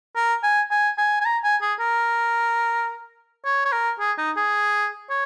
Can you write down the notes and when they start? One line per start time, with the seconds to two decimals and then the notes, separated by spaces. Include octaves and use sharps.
0.16 A#4
0.43 G#5
0.71 G#5
0.98 G#5
1.21 G#5
1.26 A#5
1.44 G#5
1.62 G#4
1.80 A#4
3.45 C#5
3.65 C#5
3.72 A#4
4.00 G#4
4.18 D#4
4.37 G#4
5.10 C#5